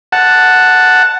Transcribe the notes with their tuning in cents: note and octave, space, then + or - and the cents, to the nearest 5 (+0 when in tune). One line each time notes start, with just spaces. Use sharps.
F#5 +0 A5 +0